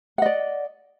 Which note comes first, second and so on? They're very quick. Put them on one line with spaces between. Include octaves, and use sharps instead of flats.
F#5 D#5 D5